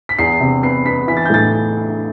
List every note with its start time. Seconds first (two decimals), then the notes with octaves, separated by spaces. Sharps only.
0.09 B6
0.19 E2 C7
0.40 C3
0.63 B3 C7
0.85 B3 B6
1.07 E3 B6
1.17 A6
1.26 G6
1.30 A2 A6